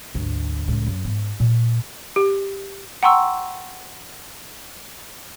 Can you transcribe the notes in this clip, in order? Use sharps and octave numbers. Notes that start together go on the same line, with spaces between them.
G#1 D2
C#2 A2
F#2
G#2 B3
A#2
G4
F#5 G5 A#5 C6 C#6 E6